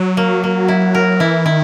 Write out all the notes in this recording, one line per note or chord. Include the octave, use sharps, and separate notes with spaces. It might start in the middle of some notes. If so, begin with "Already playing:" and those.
Already playing: F#3
A#3
A#3
E4
A#4
E3 E4
D#3 E4